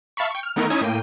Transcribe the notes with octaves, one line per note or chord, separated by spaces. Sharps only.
E5 F5 A5 B5 C#6
G5 C#6
F6
D#3 A3 B3 D#4 E4 A#4
C#4 D#4 E4 E5 D#6 G#6
A2 A#3 G5 D#7